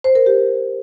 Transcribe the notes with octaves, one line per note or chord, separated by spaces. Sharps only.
C5
A#4
G4